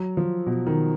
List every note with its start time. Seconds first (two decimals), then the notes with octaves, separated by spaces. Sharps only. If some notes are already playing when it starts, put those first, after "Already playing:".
Already playing: F#3
0.17 F3
0.47 B2
0.67 D#3